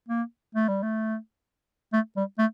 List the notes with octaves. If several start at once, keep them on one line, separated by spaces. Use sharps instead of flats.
A#3
A3
G3
A3
A3
G3
A3